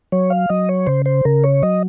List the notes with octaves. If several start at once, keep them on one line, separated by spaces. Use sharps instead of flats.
F#3 C#5
F5
F#3 D#5
C#5
C#3 C5
C5
C#3 A#4
C#5
F#3 D#5